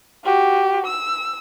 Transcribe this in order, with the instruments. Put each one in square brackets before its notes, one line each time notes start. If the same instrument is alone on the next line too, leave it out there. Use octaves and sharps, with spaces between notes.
[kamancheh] F#4 G4
E6